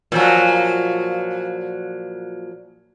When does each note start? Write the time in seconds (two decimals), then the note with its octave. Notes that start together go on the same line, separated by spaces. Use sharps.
0.12 A#2 F3 F#3